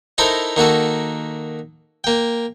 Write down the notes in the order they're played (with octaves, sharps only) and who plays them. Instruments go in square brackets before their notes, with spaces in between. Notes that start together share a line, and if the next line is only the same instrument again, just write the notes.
[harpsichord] D#4 E4 A4 A#4 C5 E5
D#3 A#3 F#4 A4
A#3 G5